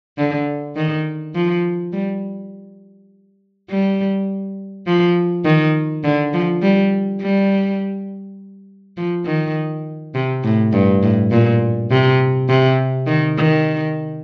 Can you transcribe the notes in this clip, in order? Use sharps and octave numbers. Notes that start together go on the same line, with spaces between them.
D3
D#3
F3
G3
G3
F3
D#3
D3
F3
G3
G3
F3
D#3
C3
A2
G2
A2
A#2
C3
C3
D#3
D#3